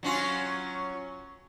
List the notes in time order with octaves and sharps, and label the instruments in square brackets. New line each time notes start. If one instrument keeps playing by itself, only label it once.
[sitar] F#3 C#4 F4